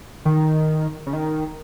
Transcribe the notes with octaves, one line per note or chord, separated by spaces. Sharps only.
D#3
C#3
D#3